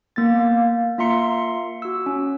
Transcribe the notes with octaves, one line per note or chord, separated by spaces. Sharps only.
A#3 B3 A6
A#3 F5
A#3 F4 E5 A#5 C6 C#7
F#4 E6
C#4